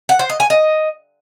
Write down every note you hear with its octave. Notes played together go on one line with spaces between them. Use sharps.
F#5
C5
D#5
G#5
D#5